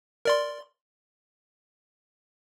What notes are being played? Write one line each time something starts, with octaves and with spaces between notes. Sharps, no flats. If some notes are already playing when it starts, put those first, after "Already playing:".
A#4 D5 C6